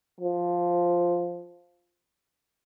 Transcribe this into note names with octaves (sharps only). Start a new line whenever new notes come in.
F3